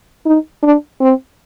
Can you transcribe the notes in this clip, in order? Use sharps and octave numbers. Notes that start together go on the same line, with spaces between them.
D#4
D4
C4